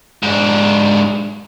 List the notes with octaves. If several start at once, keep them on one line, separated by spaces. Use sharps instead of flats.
G#2 D4